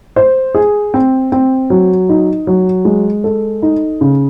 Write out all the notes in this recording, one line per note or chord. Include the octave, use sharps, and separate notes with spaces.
C5
G#4
C4
C4
F#3
D#4
F#3
G#3
A4
D#4
C#3